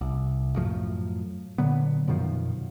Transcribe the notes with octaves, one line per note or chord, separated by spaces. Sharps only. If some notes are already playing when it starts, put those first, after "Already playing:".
C2
F#2 A2 F3
A#2 D3 F#3 B3
F#2 B2 D#3 F3